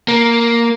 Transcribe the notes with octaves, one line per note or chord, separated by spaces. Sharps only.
A#3